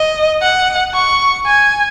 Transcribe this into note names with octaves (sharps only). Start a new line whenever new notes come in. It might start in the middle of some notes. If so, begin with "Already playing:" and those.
Already playing: D#5
F#5
C#6
G#5